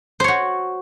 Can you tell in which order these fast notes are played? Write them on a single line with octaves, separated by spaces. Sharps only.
C5 C#5 F#4